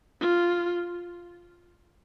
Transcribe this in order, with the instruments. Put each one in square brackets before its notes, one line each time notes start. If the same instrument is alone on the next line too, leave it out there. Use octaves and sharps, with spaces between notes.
[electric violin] F4